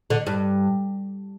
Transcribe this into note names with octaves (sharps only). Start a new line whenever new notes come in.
D3
G2